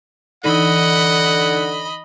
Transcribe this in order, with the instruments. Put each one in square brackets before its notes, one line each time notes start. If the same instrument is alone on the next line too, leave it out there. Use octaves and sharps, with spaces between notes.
[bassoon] D3 [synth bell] E3 D#4 [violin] D#5 B5 [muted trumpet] F#5